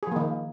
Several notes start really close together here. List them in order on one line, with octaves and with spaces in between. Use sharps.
G#4 F3 A#3 D#3